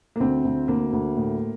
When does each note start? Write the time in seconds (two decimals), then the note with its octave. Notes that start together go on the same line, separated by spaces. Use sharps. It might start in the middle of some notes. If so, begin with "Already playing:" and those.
0.16 A#3
0.20 D2 C4
0.44 D2
0.68 D2 A#3
0.93 D2
1.17 A2